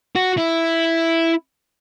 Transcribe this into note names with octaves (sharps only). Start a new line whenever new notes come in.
F#4
E4